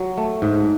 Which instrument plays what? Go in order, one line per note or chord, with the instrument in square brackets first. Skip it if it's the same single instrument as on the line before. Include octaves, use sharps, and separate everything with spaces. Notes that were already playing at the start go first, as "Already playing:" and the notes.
Already playing: [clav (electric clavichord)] F#3
A3
G#2